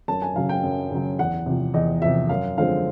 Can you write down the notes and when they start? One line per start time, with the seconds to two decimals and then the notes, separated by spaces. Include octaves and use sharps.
0.08 F#2 A5
0.22 G#5
0.36 C#3 F#3 F5
0.49 G5
0.63 F#2
0.91 C#3 F#3
1.19 E2 F#5
1.46 C3 F3
1.74 E2 D#5
2.02 C3 F3 E5
2.29 F#2 F5
2.57 D3 F3 G#3 C4 F5